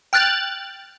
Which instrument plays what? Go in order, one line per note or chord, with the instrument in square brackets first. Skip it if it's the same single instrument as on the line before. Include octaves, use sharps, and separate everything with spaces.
[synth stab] G5 F6 F#6 A6